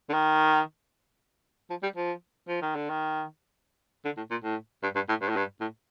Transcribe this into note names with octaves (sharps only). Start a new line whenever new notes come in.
D3
D#3
F3
G3
F3
F3
D#3
D3
D#3
D3
A2
A#2
A2
G2
G2
A2
G2
A2
G2
A2